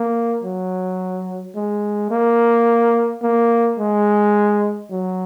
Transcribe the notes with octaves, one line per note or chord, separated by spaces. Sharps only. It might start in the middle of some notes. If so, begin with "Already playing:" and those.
Already playing: A#3
F#3
G#3
A#3
A#3
G#3
F#3